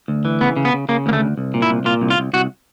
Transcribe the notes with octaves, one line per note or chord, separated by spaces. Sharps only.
D2
E3
C#3 B3
C#3
B3
C#3
C#3 A#3
D2 A#3
A3
D2
C2
A#2
E4
C2
A#2 F4
C2
F4
C2
C2 F#4